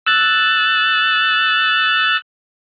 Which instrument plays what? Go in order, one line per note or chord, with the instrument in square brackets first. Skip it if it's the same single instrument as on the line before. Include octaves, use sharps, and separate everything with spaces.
[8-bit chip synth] E6 F#6 A6